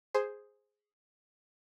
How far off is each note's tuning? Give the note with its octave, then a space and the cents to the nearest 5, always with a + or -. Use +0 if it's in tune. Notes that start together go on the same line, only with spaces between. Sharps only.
G#4 +0 C5 +0